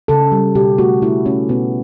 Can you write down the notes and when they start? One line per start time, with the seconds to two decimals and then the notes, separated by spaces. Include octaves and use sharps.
0.08 C#3 A4
0.32 G3
0.55 B2 G4
0.78 A3 F#4
1.02 A3 E4
1.26 A3 C#4
1.49 B2 B3